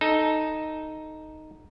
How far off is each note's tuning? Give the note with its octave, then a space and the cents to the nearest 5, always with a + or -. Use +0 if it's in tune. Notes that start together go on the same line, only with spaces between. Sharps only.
D#4 +0 A4 -10